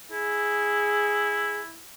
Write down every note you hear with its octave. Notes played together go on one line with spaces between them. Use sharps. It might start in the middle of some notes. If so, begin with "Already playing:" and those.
E4 G#4